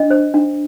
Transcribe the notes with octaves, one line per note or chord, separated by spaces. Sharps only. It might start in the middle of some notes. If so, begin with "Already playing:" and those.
Already playing: D4 D#5
C5
D4